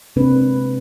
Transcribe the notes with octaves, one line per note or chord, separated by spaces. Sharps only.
C3 G#3 A#3 C4 D4 B4